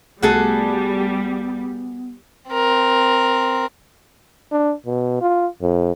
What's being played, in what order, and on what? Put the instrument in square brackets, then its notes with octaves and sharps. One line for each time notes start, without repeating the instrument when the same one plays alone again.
[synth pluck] C2 A3 [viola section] G3 [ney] B3 [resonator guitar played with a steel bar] F#4 G#4 A4
[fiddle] C4 A#4
[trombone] D4
B2
F4
F2